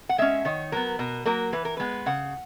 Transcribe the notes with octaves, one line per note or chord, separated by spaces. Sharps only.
F#5
G#3 C#4 E5
D#3 C#5
F#3 B3 A#4
B2 A#4
F#3 A#3 A#4
E3 B4
A#4
G#3 B3 B4
C#3 F#5